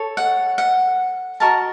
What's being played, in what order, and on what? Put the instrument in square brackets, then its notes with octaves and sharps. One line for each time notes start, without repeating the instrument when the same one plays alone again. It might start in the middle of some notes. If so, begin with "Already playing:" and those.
Already playing: [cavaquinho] A4 C#5
F#5
F#5
F#4 A#4 D#5 A5